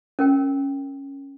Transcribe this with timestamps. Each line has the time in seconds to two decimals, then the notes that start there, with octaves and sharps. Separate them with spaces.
0.19 C#4 A#4 G5